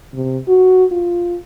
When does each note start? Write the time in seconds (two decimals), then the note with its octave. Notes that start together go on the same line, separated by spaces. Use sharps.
0.14 C3
0.48 F#4
0.91 F4